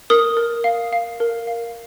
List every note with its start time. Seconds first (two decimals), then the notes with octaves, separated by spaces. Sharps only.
0.10 A#4 D#6
0.37 A#4
0.64 F5
0.93 F5
1.20 A#4
1.47 F5